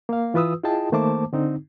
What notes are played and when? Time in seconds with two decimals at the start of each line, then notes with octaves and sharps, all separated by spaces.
0.09 A#3 F5
0.34 E3 F4 B4 D#6 E6
0.63 E4 F4 G#4 D#5 G5 A5
0.92 D#3 A3 A#3 C5 A5 D6
1.33 D3 C4 D#4